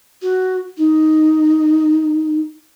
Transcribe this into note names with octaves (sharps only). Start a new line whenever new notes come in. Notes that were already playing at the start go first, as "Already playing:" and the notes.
F#4
D#4